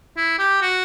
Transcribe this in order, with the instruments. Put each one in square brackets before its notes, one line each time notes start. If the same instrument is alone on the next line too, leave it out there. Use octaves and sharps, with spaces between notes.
[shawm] E4
G4
F#4